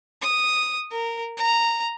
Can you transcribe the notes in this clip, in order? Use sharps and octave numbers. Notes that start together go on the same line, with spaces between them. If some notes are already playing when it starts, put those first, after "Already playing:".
D#6
A#4
A#5